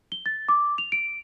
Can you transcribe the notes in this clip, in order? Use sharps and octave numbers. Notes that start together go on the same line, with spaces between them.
G7
A6
D6
F7
D7